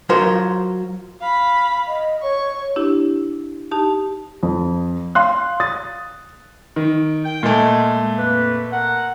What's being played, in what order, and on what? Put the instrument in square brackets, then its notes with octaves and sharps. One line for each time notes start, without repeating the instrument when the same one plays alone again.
[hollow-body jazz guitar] F#3 F4 A#4 C5
[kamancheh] F5 B5
[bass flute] D#5
[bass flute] C#5 [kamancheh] C#6
[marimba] D4 E4 G4
D#4 G4 A5
[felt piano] F2
F5 C6 F#6
D#6 A6
[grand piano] D#3
[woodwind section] G5
[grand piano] A#2 A3 [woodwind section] G#3
[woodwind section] F2 A#3 B4
A#4 F#5